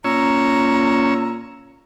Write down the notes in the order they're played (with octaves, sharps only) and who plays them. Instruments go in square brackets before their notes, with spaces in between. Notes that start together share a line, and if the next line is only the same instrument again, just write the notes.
[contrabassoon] A#2 [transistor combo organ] C#4 C#5 E6 [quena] A#5